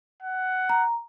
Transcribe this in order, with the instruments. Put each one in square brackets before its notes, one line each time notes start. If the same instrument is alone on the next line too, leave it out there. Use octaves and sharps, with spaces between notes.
[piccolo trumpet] F#5
[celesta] A#5